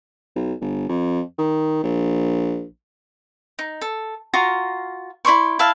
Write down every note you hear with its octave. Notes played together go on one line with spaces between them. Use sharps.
B1
G1
F2
D#3
A#1
D#4
A4
F4 F#4 A#5
E4 D5 C6 C#6
E4 E5 F5 A5